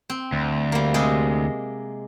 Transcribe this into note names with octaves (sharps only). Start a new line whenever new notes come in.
C4
D2
G3 A#3
C3 G#3 D#5